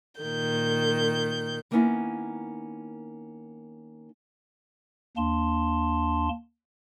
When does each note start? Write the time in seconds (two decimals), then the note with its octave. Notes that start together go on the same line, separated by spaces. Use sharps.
0.21 A#2 D#3 G6
1.71 D#3 A#3 B3 C#4 D#4 E4
5.17 D#2 A#3 D4 A5 C6